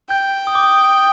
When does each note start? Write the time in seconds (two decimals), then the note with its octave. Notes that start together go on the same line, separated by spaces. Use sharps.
0.10 G5 G6
0.47 D#6
0.55 D6
0.63 D#6